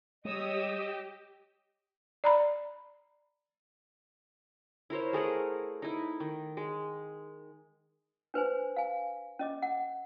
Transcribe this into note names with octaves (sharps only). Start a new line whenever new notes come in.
G3 G#3 G4 C#5 D#5 D#6 E6
D5 A#5 B5
E4 A#4 C5 C#5
A3 G#4 A#4 F#5
D#4 E4
D#3
G#3
D4 B4 C5 G#5
F5 G#5
C#4 D#5 D6
F#5